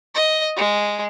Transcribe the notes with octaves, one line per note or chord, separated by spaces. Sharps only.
D#5
G#3